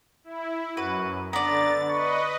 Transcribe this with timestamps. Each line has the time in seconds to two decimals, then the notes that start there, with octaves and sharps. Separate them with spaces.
0.24 E4
0.77 F#2 F#4 B4
1.33 D3 B3 D5 A#5 A6
1.90 B4 D#5 C#6